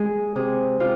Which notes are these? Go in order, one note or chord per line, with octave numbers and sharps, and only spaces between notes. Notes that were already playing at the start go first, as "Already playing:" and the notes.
Already playing: G#3 G#4
C3 G#4
C3 F4